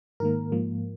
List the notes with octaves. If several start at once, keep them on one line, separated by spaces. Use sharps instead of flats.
G#2 D#3 A#3 A#4
G#2 F3 A#3